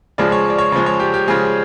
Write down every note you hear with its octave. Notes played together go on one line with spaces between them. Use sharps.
C#3 F3 G#3 D5
C#5
D5
C#5
C#3 F3 G#3
C#5
G4
G4
C#3 F3 G#3 G#4